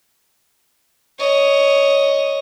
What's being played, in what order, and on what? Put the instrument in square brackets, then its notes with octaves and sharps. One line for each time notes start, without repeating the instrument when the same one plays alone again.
[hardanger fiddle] C#5 D#5